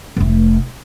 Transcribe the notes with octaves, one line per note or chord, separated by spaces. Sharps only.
F1 A3